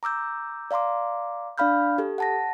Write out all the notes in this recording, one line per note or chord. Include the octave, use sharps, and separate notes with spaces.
A#5 D6 E6 G6
D5 F5 A#5 C6 D6
D4 D5 F5 B5 F6 G6
G4 A4
F#5 A5 A#6